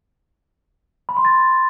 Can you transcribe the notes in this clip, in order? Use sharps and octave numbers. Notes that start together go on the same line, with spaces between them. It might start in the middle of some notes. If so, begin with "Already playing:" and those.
B5
C6
A6